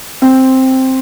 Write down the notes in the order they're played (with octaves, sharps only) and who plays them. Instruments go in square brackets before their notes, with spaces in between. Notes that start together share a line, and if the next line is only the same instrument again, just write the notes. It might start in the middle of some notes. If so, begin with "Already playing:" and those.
[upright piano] C4